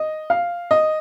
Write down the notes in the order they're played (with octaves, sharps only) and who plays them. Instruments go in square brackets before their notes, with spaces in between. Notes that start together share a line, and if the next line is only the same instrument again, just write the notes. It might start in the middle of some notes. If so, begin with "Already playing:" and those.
Already playing: [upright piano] D#5
F5
D#5